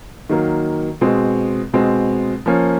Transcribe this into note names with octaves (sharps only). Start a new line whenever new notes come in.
D#3 F#3 A#3
B2 G#3 C4
B2 G#3 C4
F3 A#3 C#4